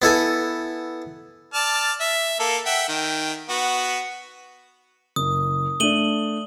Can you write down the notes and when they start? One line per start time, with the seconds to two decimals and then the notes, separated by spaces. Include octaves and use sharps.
0.02 B3 E4 A4 G#5
1.54 D5 A5 F6
2.00 E5
2.40 A#3 A4
2.66 E5 F#5 G5
2.89 D#3 G5
3.49 B3 F#4
5.16 F#1 D#6
5.80 A3 D4 D#7 F#7 G7